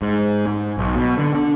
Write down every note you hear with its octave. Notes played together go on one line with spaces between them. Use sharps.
G#2
G#2
B1
B2
D3
D3